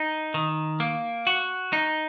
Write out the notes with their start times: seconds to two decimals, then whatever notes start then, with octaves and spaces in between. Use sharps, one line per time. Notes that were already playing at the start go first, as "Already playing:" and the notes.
Already playing: D#4
0.34 D#3
0.80 A#3
1.27 F#4
1.73 D#4